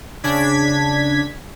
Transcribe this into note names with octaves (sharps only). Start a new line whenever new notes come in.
C#3 D4 G#6 B6